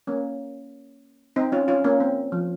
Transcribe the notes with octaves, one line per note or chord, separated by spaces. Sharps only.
A#3 C#4
C4 D#4
C#4 F4
C#4 F4
A#3 C#4
C4
F3